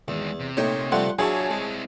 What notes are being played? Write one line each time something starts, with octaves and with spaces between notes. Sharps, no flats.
E2 D#3 G#3
C3
A#2 A3 D#4 C#5 D#5 G5
F3 G3 A3 F#5 C6
F#3 D4 E4 F4 G#4 C#5 A5
G#3 C4 E4